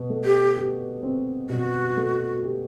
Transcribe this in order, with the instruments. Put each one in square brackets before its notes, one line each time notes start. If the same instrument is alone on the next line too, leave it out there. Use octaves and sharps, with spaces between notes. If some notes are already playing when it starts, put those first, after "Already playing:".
Already playing: [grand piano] B2
A3
[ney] G4
[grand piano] G4
C4
[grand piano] B2 [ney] F#4
[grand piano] A3
G4